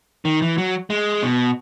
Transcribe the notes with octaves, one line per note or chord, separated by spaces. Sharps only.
D#3
E3
F#3
G#3
B2